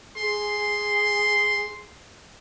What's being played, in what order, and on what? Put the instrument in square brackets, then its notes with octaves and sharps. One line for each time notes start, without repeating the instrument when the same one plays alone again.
[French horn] G#4 [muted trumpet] C6